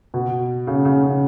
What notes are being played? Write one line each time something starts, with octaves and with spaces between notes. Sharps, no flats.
B2
C#3
C#3
C#3